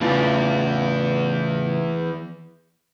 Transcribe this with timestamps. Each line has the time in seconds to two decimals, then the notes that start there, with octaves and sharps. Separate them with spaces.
0.01 E2 A2 C#3 F4